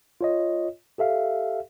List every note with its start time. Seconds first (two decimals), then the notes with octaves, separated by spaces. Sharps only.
0.21 F4 C#5 D#5
0.98 G4 A4 E5 F5